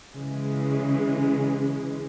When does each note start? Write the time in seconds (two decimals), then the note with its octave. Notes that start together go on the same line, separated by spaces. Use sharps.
0.12 C#3 E3 G#3